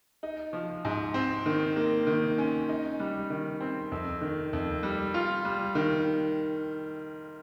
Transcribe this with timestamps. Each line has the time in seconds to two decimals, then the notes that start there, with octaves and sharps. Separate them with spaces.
0.23 D#4
0.53 F3
0.85 G#2
1.14 C4
1.46 D#3
1.76 A#3
2.07 D#3
2.38 C#4
2.69 D#4
2.99 G3
3.30 D#3
3.60 C4
3.92 F2
4.21 D#3
4.53 F2
4.83 G3
5.14 F4
5.45 G3
5.75 D#3